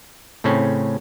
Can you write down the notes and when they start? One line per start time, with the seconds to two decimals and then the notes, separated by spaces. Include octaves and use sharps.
0.44 A2 C#3 C4 C#4